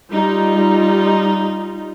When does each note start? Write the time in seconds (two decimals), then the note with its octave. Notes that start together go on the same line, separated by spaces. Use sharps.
0.10 G3 D#4 F4